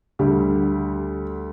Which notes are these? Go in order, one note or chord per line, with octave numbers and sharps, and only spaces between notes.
D2 D3 G3 G4